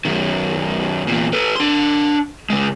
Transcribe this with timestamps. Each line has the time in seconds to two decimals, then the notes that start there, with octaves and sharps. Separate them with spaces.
0.05 F#2 D#3
1.07 E2 A#2
1.33 A4 B4
1.56 D4 C6
2.50 C#3 G#3